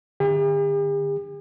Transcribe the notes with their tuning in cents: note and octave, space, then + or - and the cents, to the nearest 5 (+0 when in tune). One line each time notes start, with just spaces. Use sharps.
D3 +30 G4 +45